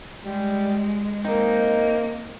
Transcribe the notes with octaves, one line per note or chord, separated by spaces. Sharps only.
G3 G#3
A#3 C4 D#4